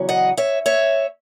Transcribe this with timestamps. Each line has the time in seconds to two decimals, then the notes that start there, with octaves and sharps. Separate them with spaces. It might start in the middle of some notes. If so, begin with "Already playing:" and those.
Already playing: E2 C#3 F#3 C#4
0.09 D#5 F#5
0.37 C#5 E5
0.66 C#5 E5